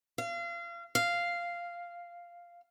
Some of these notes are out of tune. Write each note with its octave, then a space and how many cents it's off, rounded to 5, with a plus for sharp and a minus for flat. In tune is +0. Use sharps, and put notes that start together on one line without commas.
F5 -30
F5 -5